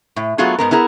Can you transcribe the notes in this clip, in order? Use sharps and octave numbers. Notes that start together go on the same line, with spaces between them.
A2
F#3 A3 B3 F4 F#4 G#4
G#2 B3 A#4
B3 E4 G#4 A#4